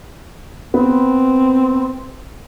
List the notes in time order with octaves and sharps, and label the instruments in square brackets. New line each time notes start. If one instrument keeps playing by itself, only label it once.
[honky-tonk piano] B3 [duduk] C4